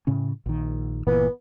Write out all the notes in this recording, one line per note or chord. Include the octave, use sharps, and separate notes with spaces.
A2 C#3 C#4
A#1 D#3
G1 A#2 E3 B3